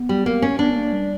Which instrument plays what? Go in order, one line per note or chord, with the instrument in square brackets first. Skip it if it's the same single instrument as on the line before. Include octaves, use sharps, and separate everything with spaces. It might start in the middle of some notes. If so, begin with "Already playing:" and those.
Already playing: [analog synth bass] B3
[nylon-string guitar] G3
A#3
C#4
[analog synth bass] B3 [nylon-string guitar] D4
[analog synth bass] A#3
G3